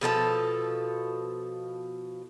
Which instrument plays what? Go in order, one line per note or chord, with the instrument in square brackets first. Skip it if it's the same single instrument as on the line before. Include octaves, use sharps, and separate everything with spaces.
[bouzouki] B2 F3 A4 A5